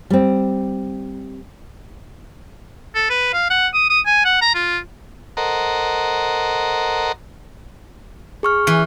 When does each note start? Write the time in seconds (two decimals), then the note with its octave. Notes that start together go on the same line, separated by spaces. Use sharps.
0.10 G3 C4
2.95 A4
3.10 B4
3.33 F5
3.50 F#5
3.74 D#6
3.90 D#6
4.06 G#5
4.25 F#5
4.42 A#5
4.55 F4
5.37 A4 A#4 C5 D#5 F#5 A#5
8.43 G#4 C#6 F6
8.67 E3